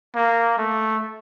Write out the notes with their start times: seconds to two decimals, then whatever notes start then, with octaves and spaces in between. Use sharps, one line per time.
0.15 A#3
0.58 A3